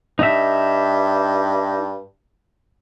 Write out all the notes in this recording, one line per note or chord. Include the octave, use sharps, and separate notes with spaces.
G2 D#4 E5